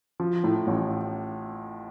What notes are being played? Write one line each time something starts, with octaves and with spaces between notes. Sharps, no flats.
F3
A2
A1